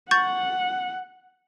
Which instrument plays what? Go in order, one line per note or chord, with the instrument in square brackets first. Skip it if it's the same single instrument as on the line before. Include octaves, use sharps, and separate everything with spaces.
[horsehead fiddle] F#5 [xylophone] C#6 G6 A6